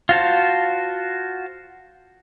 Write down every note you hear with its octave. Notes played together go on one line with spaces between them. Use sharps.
F4 F#4 C5 A5